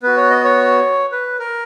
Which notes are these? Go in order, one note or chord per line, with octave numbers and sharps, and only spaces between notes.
B3 F#4 B4
C#5
D#5
C#5
B4
A#4